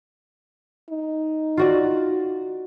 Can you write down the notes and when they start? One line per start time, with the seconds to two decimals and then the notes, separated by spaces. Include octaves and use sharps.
0.90 D#4
1.57 F4 F#4 D5